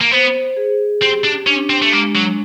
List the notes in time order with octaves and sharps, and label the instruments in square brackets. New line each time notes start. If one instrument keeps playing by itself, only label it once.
[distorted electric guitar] A#3
[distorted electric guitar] B3 [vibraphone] C5
[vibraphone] G#4
[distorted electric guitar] C4 [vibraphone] G4
[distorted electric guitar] D4
[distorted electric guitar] C#4 [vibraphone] D4
[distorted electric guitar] C4
A3
[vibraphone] G#3 [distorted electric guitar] A#3
[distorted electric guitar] F#3